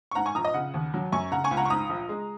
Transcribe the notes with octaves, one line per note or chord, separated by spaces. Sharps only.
C#6
G#2 F#5 A#5
G#5 C#6
A#1 A#5 D#6
D#5
C#3 F#5
D#2
F#3
F#2 G#5 C#6
C#3 F#5 A#5
G#5 C#6
C#2
F#5 A#5
C#6
G#2 A#5 D#6
A#1
G#3